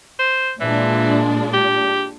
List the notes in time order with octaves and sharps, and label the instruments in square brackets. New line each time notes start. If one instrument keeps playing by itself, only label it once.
[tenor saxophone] C5
[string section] A#2 G#3 D4 [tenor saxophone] E3
[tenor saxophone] G4